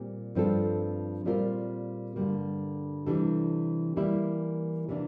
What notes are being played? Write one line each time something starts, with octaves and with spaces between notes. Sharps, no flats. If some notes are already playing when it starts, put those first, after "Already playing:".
Already playing: A#2 G3 C4
G2 F3 C4 F4 A4
A#2 G3 C4 F4 A#4
G2 D3 G3 A#3
C3 E3 G3 D4 A4
E3 G3 A#3 E4
C3 E3 A#3 D4